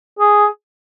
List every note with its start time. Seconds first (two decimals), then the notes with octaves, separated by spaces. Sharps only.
0.19 G#4